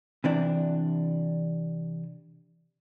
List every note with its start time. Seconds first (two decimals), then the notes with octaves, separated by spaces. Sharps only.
0.24 C3 E3 D4